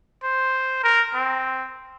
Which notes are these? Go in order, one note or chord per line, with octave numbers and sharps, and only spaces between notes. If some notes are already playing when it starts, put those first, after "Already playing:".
C5
A#4
C4